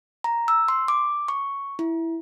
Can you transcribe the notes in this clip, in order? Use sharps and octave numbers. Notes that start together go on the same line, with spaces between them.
A#5
E6
C6
D6
C#6
E4